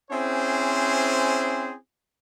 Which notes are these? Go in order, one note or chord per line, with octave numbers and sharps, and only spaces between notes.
C4 C#4 E4 G#4 C5